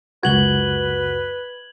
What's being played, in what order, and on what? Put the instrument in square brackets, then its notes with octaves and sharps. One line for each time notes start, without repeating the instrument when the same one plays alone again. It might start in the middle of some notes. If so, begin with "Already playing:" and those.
[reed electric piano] C#2 F#2 F#4 [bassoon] B4 [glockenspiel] G#6 F#7 G7